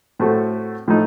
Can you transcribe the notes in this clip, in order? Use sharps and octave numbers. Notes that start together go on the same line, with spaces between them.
A2 A3 C4 F#4 A4
A2 F3 A3 D#4